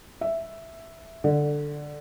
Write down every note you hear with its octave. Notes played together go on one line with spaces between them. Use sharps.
E5
D3